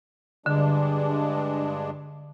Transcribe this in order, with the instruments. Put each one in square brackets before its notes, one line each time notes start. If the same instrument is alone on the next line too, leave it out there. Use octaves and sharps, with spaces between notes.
[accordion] G2 G#3 D4 [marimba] D3